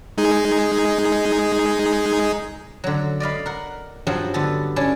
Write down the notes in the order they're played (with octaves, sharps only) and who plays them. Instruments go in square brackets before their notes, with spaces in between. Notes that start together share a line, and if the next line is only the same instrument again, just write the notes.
[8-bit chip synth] G#3 D#4 G#4
[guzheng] D3 F#3
D5 D#5 F5 B5
A#4 F#5
G2 F3 F#3 F#5
D3 B3 A4
C#4 D4 E4 C#5 D5